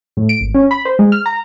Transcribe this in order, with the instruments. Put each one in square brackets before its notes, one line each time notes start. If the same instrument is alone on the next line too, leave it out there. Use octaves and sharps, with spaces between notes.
[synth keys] A2
D7
G#1
C#4
B5
C5
G#3
F6
A#5